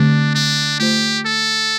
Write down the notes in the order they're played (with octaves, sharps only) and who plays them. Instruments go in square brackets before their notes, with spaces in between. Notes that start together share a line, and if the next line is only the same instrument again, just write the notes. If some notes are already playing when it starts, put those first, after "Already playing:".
Already playing: [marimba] D3 A3 C4 G4 [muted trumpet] D4
[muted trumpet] D4
[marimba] A3 F4 C5 [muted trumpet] G4
[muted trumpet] A4